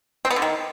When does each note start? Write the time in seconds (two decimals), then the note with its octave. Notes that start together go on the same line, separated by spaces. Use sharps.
0.25 C4
0.30 B3
0.36 D3
0.42 D#3